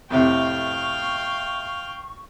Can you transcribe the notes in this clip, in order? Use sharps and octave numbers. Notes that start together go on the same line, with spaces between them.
F2 A2 C3 F5 G5 C#6